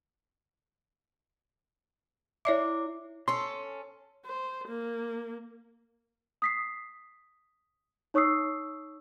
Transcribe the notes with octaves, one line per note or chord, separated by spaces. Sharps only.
E4 C#5 D5 E5 D6
C#4 A4 C6
C5
A#3
D#6 B6 C7
D#4 C#5 C#6 D#6 E6 C7